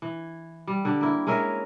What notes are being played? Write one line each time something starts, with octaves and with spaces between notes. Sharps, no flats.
E3
G3
D3 G4
A#3 E4
G#3 C#4 A#4 E5